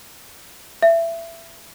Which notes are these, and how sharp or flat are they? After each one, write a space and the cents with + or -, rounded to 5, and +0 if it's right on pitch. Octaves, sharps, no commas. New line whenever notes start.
E5 +20